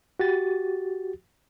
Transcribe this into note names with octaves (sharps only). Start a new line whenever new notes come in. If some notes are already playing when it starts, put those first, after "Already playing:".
F#4 G4 A6